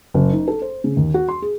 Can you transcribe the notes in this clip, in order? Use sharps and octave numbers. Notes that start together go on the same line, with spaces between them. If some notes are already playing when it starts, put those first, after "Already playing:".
F#1
D#4
A4
C5
C#3
D#2
F#4
C6
G#4